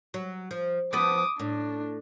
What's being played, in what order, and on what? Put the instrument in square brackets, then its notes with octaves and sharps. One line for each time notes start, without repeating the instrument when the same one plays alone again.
[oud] F#3
F3
[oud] F3 B3 B4 [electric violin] D6 D#6
[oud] A2 [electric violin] D4